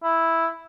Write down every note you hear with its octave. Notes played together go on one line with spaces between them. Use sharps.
E4